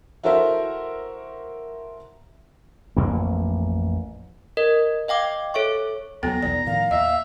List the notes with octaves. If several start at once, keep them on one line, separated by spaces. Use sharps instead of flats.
E4 F#4 A4 A#4 C5 E5
A1 F2 A#3
A#4 D#5
D#5 F5 G5 D6
A4 C#5 E5 C#6
D#2 F3 F#3 B3 A4 G5 A#5
B1 E2 F#3 D5
A2 D#3 F3 F5
D#2 D#5 E5